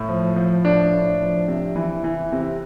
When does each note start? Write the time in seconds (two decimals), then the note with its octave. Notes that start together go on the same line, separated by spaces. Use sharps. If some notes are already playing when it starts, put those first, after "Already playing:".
Already playing: A2
0.09 F3
0.36 F3
0.64 A2 D4
0.93 A2
1.21 F3
1.48 C3
1.76 E3
2.04 E3
2.32 C3